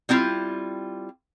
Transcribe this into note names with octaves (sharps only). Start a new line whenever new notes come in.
G3 C4 E4 F4